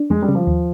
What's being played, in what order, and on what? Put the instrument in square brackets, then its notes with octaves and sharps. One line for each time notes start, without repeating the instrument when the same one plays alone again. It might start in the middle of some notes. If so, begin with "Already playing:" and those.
Already playing: [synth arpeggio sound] D4
[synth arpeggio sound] F2 [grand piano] G#3
[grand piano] G3
[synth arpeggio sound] C#3
[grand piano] F3
[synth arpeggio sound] D#2